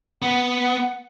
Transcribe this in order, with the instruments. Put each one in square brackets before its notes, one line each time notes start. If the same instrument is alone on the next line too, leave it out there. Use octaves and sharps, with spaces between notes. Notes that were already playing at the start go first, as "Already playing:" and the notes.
[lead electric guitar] B3 [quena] F#5